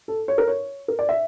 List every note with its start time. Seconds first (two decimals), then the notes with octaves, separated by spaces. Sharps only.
0.08 A4
0.28 C#5
0.38 A#4
0.48 C#5
0.88 A#4
0.99 D5
1.09 E5